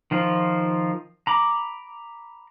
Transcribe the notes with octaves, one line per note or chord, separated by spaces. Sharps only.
D#3 F3 F4
A#5 B5 D6